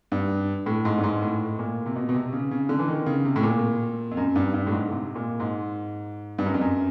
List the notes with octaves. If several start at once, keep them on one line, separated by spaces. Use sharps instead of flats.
G2
A2
G#2
G2
G#2
A2
A#2
C3
B2
B2
C3
C#3
C#3
D3
E3
D#3
C#3
C3
A2
A#2
F2
F#2
G2
G2
A2
G#2
C3
A#2
G#2
G2
F#2
F2
F#2